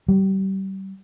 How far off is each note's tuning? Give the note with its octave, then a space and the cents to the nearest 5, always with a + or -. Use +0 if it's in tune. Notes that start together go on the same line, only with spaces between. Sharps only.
G3 -30